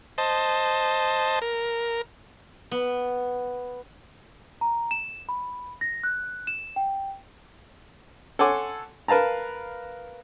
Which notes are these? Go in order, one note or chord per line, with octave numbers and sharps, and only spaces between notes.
C5 D#5 A5
A#4
B3
A#5
E7
B5
A#6
F#6
E7
G5
A4 C#5 F#5 G#5 C6 D6
A#4 B4 F5 A5 A#5